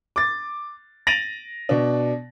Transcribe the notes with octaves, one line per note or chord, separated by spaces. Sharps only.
D6 A6
A6 A#6 D7 D#7 F7 F#7
B2 D4